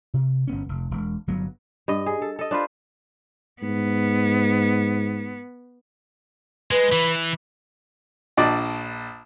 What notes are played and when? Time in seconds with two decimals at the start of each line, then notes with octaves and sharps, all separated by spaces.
0.14 C3
0.47 G1 B3 C#4
0.69 F1
0.91 E1
1.27 G1 F#3 B3
1.88 G2 D#5
2.06 G#4
2.22 A4
2.39 A4 D#5
2.51 D4 F4 B4 C5
3.62 G#2 B3
6.71 G#3 B4
6.92 E3
8.37 A#1 D4 D5 D#5